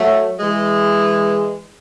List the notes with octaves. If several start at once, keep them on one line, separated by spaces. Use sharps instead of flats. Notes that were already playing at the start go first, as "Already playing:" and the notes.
Already playing: F#3 A3
E3 G#3